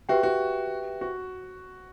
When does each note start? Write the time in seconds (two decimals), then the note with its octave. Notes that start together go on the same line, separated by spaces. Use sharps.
0.09 F#4 G4 B4 E5 G5
0.23 F#4
1.01 F#4